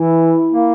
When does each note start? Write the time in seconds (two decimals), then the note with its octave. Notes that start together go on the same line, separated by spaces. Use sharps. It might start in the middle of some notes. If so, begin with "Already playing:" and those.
Already playing: E3 E4
0.53 A#3